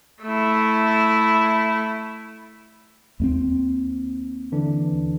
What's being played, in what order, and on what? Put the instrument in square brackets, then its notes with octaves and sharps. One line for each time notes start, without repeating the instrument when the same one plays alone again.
[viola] A3 E4
[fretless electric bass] D#2 A3 C4
[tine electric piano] D3 E3 D4